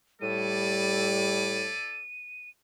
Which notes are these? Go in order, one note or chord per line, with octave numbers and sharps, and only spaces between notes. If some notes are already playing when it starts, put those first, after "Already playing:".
A2 G3 E4 A4 D5 D#7